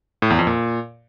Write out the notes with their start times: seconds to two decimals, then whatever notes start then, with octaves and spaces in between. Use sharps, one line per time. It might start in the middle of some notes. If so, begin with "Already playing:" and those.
0.22 A2
0.30 E2
0.39 F2
0.47 A#2